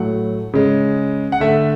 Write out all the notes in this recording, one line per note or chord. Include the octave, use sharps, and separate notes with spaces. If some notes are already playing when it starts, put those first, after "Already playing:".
Already playing: A2 F#3 A3 F#5
C#3 G#3
F#5
D3 A3 E5